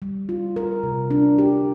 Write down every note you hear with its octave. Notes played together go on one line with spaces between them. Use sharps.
G3
F4
A#4
C3
D4
G4